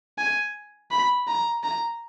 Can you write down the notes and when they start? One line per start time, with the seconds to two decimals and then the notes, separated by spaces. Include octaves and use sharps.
0.18 G#5
0.91 B5
1.28 A#5
1.63 A#5